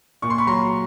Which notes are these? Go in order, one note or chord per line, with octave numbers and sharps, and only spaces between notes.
A#2 C#6
C6
B5 C#6
F#3 A#5 C6